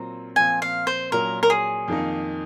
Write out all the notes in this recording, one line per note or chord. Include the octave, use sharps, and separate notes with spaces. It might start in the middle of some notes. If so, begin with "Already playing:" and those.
Already playing: A#2 F#3 C4 F4 A#5
A#2 F3 C4 G#5
F5
C5
A#2 F#3 C#4 A#4
A#4
G#4
F2 D#3 A#3 D#4